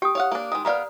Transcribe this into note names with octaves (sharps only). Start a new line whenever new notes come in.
G4 G5 D#6
C#5 F5 F#5
A#3 D4
D#3 G#3 D#6
B3 A#4 B4 D5 F5 A#5